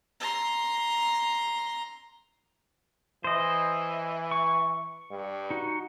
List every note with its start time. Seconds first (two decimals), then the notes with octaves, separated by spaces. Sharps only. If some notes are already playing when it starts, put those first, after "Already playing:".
0.20 A#5 C6
3.24 E3 C5 D#5
4.31 C#6
5.11 G2
5.51 D#4 F#4